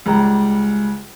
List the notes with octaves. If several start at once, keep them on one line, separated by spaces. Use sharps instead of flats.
C#2 G3 A#5